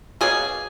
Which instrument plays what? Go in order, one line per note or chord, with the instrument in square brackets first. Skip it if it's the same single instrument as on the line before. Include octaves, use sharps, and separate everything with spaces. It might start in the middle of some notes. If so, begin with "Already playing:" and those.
[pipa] B2 A#3 C#4 G#4